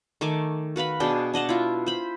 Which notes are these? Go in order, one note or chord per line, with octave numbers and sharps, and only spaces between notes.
D#3 A3 G#5 D6
F#4 B4 F5 B5
B2 D4 G#4 G5
D4 D#5 F#5 A5
E4 F4
C5 B5